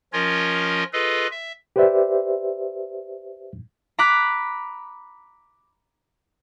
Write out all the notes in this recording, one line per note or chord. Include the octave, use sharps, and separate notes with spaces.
F3 C#4 F4 A#4 C#5 D#5
F4 G#4 A4 B4 D#5
E5
G4 B4 C5 D5 E5
A#5 B5 D6 F#6 B6